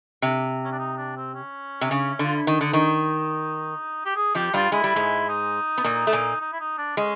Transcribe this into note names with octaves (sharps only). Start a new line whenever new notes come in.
C3
C#4
D4
D#4
D4
C4
C#4
C3
C#3
D3 F4
E4
D#3 D#4
D3
D#3
G4
G#4
F2 F3 G4
G2 G3 F4
G#3 E4
G3
G#2 G#3
D#4
B3
A#2 A#3
A3
A#2 A#3
D#4
E4
D#4
D4
G#3 C#4